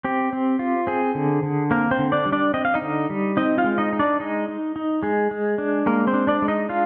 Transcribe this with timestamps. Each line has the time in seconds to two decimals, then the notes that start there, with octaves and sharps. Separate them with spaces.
0.04 C4 G4
0.33 C4
0.59 F4
0.87 C4 G#4
1.15 D3
1.43 D3
1.71 A#3 C4 A#4
1.91 C4 C5
1.99 D3
2.12 D4 D5
2.26 G3
2.32 D4 D5
2.54 C4 D#5
2.65 F5
2.74 D#4 D#5
2.82 D3
3.10 G3
3.37 C4 D#4 D#5
3.58 F4 F5
3.64 G#3
3.78 D#4 D#5
3.93 D#4
3.99 D4 D5
4.20 G#3 D#4 D#5
4.48 D#4
4.76 D#4
5.03 G#3 G#4
5.31 G#3
5.58 D4
5.86 G#3 A#3 A#4
6.07 C4 C5
6.13 D4
6.27 D4 D5
6.42 G#3
6.48 D#4 D#5
6.69 D4 F4 F5